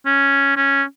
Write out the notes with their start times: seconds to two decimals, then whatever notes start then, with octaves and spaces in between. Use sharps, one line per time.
0.06 C#4
0.56 C#4